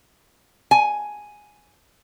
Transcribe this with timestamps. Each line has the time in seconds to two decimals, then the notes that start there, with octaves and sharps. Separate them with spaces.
0.71 G#5